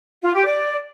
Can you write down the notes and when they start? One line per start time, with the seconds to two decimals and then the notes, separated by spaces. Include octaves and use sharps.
0.22 F4
0.34 G4
0.45 D5